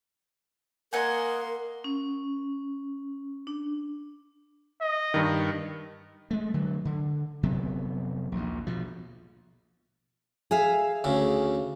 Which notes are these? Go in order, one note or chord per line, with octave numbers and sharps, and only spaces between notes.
A#3 A#4 D#5 F#5 G#5 C6
C#4
D4
D#5
G2 D#3
G#3 A3
D3 F#3
D3
F1 C3 F#3 B3
A#1 D#2
B2 F3
G#4 E5 F5
D2 C#3